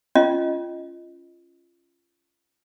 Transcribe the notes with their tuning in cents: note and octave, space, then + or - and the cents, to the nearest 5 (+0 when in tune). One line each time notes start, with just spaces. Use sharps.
C#4 +0 F4 -20 D#5 +0